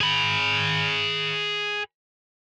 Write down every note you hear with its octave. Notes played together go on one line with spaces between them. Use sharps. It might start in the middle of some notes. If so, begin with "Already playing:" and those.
G#4 B5